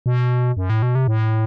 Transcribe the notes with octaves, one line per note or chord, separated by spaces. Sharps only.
B2
F#2
A2
B2
C3
A2